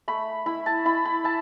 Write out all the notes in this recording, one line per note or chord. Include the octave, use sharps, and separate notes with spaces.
A3 B5
E4 B5
A5
E4 B5
B5
E4 A5